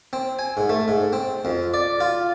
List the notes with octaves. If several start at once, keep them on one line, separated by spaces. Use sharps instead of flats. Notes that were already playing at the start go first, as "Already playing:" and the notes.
C4
G#5
G#2
A3
G#2
C4
F2
D5
F4